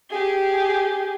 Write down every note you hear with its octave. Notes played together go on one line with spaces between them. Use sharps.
G4 G#4